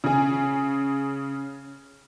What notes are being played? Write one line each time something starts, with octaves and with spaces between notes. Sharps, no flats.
C#3 G#4